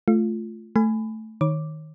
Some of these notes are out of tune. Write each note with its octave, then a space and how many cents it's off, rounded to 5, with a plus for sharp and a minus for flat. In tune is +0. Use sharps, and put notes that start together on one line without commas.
A3 -10 F4 -5
A3 +0 G#5 +0 B5 +25
D#3 +0 C#5 -15 D6 +0